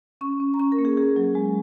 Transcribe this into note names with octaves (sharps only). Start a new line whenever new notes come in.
C#4 C#6
C#4
A#5
C#4 C#6
A#4
A#3
G#4
C#4 G#4
F#3
G#3